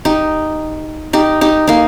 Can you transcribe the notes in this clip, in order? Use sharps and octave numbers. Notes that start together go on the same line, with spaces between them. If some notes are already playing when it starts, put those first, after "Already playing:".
D#4 G4
D#4 G4
D#4 G4
A#3 D#4